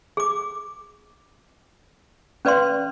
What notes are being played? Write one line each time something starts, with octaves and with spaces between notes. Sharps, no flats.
G#4 D6
C#4 B4 D5 F5 C6